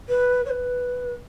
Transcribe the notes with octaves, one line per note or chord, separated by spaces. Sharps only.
B4
C#5
B4